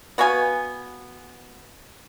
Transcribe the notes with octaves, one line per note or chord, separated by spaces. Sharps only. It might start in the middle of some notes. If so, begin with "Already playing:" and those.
B3 F#4 F5 G#5